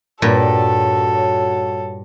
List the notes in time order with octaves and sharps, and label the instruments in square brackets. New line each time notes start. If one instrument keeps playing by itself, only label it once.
[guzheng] G2 [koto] A#2 [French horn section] F#4 C#5 [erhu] A4